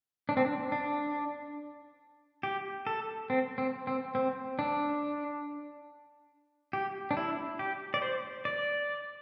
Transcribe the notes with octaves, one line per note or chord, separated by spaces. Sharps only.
D4
C4
D4
D4
G4
A4
C4
C4
C4
C4
D4
G4
D4
E4
G4
D5
C5
D5